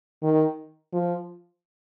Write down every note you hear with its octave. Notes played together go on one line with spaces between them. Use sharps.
D#3
F3